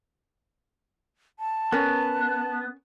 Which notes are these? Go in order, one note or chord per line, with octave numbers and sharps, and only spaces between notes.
A5
B3 C#4 A#4